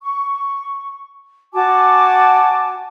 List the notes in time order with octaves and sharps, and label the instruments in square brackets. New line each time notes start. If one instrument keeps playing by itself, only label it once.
[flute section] C#6
F#4 G#5 A5 D6